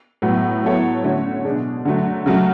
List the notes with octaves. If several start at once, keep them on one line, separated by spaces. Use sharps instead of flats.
A2 F#3 B3
F#3 B3 E4 A4 C#5
D3 A3 C#4 F#4 C#5
B2 G#3 D4 G#4
D3 F#3 A3
C#3 F#3 A3